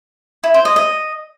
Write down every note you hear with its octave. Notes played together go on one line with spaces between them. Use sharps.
E4
C5
D#5
D#5